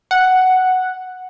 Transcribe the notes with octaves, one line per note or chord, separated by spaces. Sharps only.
F#5